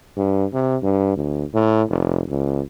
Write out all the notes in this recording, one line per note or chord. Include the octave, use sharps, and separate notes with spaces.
G2
C3
G2
D2
A2
F1
C#2